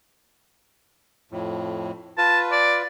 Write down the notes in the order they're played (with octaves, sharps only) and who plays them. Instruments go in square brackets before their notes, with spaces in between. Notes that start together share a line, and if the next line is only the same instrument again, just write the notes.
[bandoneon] F2 A2
[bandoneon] F4 B4 [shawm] A5
[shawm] D5